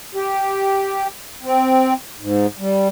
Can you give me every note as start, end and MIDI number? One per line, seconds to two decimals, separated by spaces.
0.15 1.07 67
1.43 1.94 60
2.20 2.47 44
2.59 2.88 55